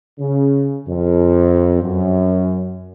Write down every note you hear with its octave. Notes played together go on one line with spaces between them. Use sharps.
C#3
F2
F#2